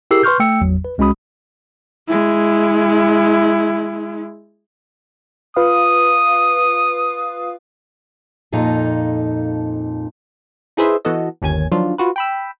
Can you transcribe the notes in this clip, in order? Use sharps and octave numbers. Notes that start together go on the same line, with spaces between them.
E4 G4 G#4 A#4 E6 C7
B4 C6 C#6 F6 G6
A3 G5 E6 C#7
G#1 E2 F#3
B4
C2 G#3 C#4 F#4 B5 D#6
G#3 E4
F4 B4 F5 D#6
F2 A#2 D#4 A4 A#5
D#4 E4 G#4 B4 C5 E5
E3 B3 F#4 A4 D#5
G1 D#2 C#4 G#5 G#6
D#3 F3 F#3 D4 F4
F4 F#4 B4
G5 B5 E6